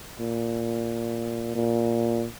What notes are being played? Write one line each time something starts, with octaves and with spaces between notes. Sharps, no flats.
A#2
A#2